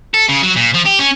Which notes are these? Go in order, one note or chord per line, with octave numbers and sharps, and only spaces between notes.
A4
C#3
F#3
A#2
F3
G4
C#4